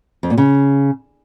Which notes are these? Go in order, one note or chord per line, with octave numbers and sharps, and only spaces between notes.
F2
A#2
C#3